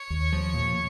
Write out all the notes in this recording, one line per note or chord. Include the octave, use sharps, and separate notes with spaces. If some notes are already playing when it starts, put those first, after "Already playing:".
Already playing: C#5
D#2
F3
A#2